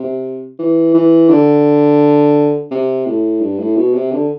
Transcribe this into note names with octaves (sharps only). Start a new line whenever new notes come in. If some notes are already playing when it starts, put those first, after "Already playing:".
Already playing: C3
E3
E3
D3
C3
A2
G2
A2
B2
C3
D3